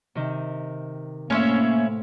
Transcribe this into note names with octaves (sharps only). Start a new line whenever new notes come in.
C3 D#3
A2 A#3 C#4 D#4 E4 C5 F6